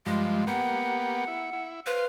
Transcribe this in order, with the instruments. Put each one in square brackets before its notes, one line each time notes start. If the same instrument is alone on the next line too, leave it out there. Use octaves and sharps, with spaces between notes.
[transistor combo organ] G2 F3 [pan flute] G#3
[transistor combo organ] A#3 B3 G4 [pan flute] F#5
[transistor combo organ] E4
E4
[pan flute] B4 [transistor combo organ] C5 F5